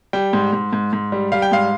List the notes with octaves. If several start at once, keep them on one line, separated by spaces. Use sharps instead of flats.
G3 G5
G#2
G#2
G#2
G#2
G3
G3 F5
G5
G#2 F5